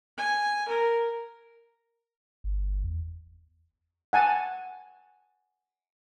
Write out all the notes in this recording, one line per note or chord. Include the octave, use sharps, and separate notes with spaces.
G#5
A#4
G1
E2
F#5 G#5 A5